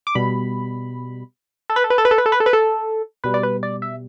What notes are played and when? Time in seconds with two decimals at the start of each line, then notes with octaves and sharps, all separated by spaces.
0.07 D6
0.15 B2 G3 B5
1.70 A4
1.76 B4
1.84 A4
1.90 B4
1.98 A4
2.05 B4
2.11 A4
2.18 B4
2.26 A4
2.32 B4
2.40 A4
2.46 B4
2.53 A4
3.24 B2 G3 B4
3.34 D5
3.43 B4
3.63 D5
3.82 E5